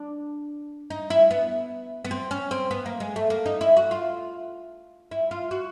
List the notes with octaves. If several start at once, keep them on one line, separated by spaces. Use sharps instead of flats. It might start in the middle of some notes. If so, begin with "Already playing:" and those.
Already playing: D4
D#4
E4
B3
B3
C4
C#4
C4
B3
A#3
G#3
A3
A#3
D#4
E4
F#4
F4
E4
F4
F#4